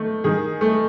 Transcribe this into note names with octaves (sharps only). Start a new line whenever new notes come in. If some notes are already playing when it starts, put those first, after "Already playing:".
Already playing: D#3 A3
D#3 G#4
A3